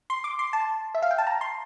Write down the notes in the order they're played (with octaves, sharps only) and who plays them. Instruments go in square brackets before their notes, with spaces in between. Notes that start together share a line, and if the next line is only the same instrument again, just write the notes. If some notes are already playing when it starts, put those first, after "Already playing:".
[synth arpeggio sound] C6
D6
C6
A5
E5
F5
G5
A5
A#5
C6